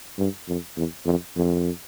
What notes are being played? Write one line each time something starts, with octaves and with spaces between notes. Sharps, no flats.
G2
F2
E2
F2
F2